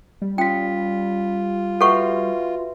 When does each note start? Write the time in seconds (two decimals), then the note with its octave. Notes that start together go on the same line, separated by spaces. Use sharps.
0.22 G3
0.38 C#4 F4 G5 B6
1.81 F#4 A4 B4 E5 F#5 C#6